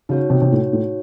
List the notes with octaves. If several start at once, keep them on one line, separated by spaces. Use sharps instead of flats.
C#3 D#4 F#4 C#5
C3
C3
A2
A2